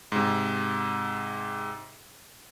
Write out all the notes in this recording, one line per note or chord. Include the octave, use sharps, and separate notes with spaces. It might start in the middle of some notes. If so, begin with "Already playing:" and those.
G#2 C3